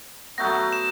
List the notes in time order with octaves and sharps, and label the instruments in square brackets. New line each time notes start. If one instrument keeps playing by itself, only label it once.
[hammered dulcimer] F#3 A3 B3 [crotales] G6 A#6
[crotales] E7